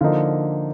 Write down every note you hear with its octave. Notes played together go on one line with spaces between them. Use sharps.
D3 F3 A#3 D#4 F5